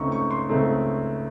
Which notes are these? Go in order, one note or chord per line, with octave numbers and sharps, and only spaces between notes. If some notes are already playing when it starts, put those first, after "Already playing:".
Already playing: C#2 C#3 A3 C4 D#4 C#6
C#6
C6
C#2 C#3 A3 C4 D#4